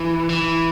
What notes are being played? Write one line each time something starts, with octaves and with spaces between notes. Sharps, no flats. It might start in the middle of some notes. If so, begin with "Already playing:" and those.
Already playing: E3
E3